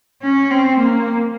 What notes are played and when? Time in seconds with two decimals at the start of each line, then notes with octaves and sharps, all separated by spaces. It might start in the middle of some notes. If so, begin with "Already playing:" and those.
0.22 C#4
0.51 C4
0.80 A#3